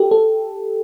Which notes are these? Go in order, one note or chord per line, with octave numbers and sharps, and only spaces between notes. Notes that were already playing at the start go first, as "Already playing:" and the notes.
Already playing: G4 A4
A4